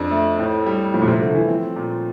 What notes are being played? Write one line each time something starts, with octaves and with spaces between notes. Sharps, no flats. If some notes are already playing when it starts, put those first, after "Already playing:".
Already playing: F2 F3 D4
A3
A2
G3
A2 F3
A#2
C3
D3 A3
E3
C4
A#2